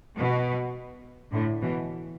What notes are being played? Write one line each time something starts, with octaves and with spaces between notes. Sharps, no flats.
B2
A2 D3
B2 E3